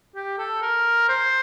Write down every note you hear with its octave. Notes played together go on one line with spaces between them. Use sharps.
G4
A4
A#4
C5